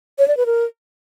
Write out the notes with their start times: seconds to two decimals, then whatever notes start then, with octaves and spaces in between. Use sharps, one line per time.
0.18 C#5
0.28 D5
0.37 B4
0.46 A#4